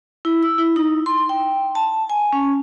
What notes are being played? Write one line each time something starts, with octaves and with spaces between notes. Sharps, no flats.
E4
E6
E4
D#4
C6
G5
A5
G#5
C#4